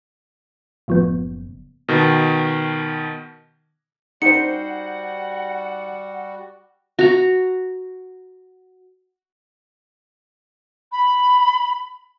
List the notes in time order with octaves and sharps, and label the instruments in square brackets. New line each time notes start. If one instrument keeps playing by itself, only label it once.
[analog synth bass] F#1 [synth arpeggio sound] A2 F3 B3
[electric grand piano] B2 D#3
[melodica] G3 F#4 [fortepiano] D#4 C5 [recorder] F#5 [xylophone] C#7
[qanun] F#4 A#5
[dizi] B5